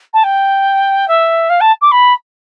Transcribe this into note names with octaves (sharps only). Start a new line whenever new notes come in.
A5
G5
E5
F5
A5
D6
B5